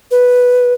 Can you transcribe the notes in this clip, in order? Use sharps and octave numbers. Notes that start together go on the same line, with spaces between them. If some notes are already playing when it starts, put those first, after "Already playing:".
B4